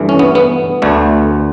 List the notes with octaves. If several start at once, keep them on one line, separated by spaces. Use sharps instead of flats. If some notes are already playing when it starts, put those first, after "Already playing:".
Already playing: G2 E3 A3
C#4
B3
B3
D2 D3 A3